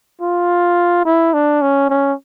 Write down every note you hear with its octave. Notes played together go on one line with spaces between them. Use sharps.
F4
E4
D4
C#4
C#4